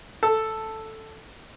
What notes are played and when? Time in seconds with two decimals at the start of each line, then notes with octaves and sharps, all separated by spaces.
0.23 A4